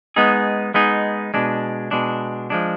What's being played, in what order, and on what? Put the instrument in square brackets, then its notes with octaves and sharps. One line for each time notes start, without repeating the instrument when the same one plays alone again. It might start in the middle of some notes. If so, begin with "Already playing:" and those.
[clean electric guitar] G#3 B3 D#4 G#4
G#3 B3 D#4 G#4
B2 G#3 D4
B2 G#3 D4
F3 G#3 D4